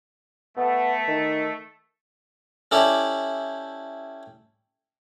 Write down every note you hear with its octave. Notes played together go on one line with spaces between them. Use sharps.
A3 B3
D#3
C#4 E4 G4 A4 C#5 D5